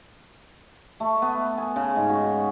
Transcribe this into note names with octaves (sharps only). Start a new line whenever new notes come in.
A3
B3
G#5
C#3
G#2
F#4